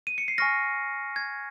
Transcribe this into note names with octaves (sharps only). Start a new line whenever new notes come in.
D#7
C#7
C7
G#5 C#6 F6 A#6
G#6